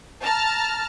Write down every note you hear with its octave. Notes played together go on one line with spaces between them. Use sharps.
A5 A#5 F6